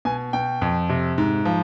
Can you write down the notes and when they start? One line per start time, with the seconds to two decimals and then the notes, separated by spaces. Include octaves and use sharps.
0.05 B2 G#5
0.33 B2 G5
0.62 F2
0.89 C3
1.18 G#2
1.45 F3